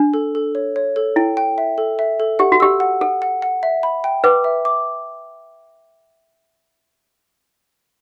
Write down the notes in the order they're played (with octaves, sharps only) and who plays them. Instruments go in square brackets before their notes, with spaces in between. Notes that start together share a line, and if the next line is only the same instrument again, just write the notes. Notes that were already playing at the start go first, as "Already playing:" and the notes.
Already playing: [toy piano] D4
[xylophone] A4
A4
C#5
C#5
A4
[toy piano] E4 [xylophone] G5
[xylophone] G5
E5
A4
E5
A4
[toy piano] G4 [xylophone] F#5
[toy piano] F#4
[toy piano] G4 [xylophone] E6
[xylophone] F#5
[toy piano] A4 [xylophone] F#5
[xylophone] F#5
F#5
E5
B5
G5
[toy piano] B4 [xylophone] D6
[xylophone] E5
D6